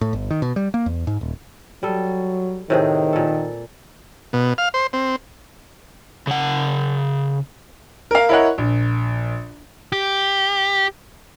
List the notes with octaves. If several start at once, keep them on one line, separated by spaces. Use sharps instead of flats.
A2
G1
D#3
B2
G3
A#3
E2
G#2
D#1
F#3 G3 A4
A2 C3 D#3 G#4
A#2 A4
B2
F5
C5
C4
C#3 F#5
A#4 F5
E4 A#4 C#5 D#5 F#5
A#1
G4